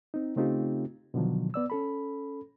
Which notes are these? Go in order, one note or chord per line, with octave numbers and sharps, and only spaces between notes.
C4 D#4
C#3 A3 C4 D#4 F4 G4
B2 D3 D#3 F3 F#3
B3 D5 E6
C#4 A4 B5